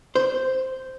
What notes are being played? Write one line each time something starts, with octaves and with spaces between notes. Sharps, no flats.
C5